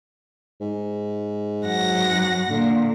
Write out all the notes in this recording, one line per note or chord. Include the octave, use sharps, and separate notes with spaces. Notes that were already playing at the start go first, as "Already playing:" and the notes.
G#2
F#2 F#5 A#6
A#2 D3